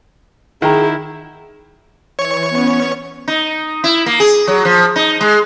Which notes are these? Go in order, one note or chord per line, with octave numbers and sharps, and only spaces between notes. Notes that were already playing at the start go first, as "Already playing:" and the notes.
D#3 E4 G#4 F#5 G5 A#5
E3 C#5 C#6
B3 C#4
D#4
E4
A#3
G#4
F#3
F3
D#4
G#3